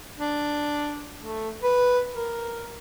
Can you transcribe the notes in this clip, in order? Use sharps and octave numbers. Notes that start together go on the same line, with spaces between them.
D4
A3
B4
A#4